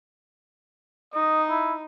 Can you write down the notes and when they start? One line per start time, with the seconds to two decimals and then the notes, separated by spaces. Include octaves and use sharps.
1.13 D#4 D#5
1.49 E4